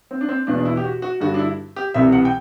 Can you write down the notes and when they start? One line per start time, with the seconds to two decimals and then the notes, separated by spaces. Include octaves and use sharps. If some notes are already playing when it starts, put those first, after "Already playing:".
0.11 C4
0.21 D4
0.29 C4
0.47 E2 B2 D4
0.58 D4
0.65 E4
0.77 G4
0.84 F#4
1.02 F#4
1.20 G2 D3 F#4
1.34 D4
1.39 E4
1.76 G4
1.94 C2 C3 E3 E5
2.12 F#5
2.25 G5